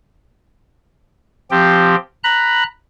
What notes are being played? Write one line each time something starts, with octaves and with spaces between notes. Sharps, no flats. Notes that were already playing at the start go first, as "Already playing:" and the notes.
F3 C4 G4 G5
A#5 B5 F#6